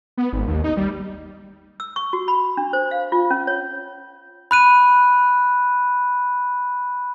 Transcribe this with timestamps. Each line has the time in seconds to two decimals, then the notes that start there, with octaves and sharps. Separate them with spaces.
0.17 B3
0.33 G#1
0.48 D#2
0.64 D#4
0.77 G3
1.80 E6
1.96 C#6
2.13 F#4
2.28 B5
2.57 D4
2.73 C5
2.91 F5
3.12 F4
3.31 C#4
3.47 C#5
4.51 B5 F#6 D#7